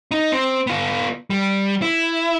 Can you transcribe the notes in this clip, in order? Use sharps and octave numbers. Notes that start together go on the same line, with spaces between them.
D#4
C4
B3 F4
G3
E4